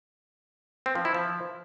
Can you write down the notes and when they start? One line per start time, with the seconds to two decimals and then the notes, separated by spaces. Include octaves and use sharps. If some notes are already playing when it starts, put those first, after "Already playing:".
0.86 C4
0.95 F3
1.05 E4
1.15 F3